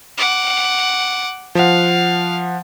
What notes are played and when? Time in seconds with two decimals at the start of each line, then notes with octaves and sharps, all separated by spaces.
0.18 F#5 D6
1.55 F3 F5 F#5